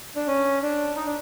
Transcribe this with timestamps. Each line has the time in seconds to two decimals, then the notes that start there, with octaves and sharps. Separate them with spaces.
0.16 D4
0.27 C#4
0.62 D4
0.96 D#4
1.06 D4